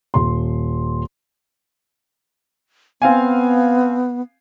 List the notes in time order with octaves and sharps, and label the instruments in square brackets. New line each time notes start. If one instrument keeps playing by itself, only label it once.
[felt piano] D#1 C6
[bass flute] B3 [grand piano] C4 F5 G#5